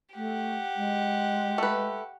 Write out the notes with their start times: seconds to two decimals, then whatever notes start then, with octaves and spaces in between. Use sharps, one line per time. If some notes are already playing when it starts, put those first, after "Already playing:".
0.15 A3 G4 F#5
0.75 G#3
1.58 A3 B4